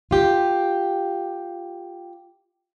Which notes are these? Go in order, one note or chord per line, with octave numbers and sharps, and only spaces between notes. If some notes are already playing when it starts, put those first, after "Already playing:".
F4 G4